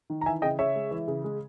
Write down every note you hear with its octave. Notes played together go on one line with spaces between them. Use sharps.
D#3
A#5
E3 E5 G#5
C#3 D#5 G5
C#3 C#5 E5
G#3
E3
C#3
G#3